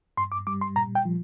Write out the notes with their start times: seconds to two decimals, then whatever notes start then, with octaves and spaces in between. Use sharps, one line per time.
0.17 G2 C6
0.32 D6
0.47 G3 D6
0.61 C6
0.76 A#2 A#5
0.95 G5
1.05 F3